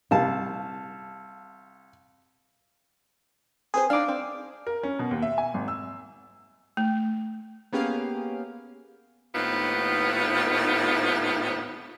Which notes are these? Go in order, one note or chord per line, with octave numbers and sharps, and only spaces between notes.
C2 F5 A5
C4 G#4 B4 C5
D4 D#4 F5 D6
C4
A#4
C#4
B2
D#2
E5
G#5
G#1
E6
A3
A#3 B3 C#4 G4 G#4 F5
D#2 A2 B3 C4 D#4 F4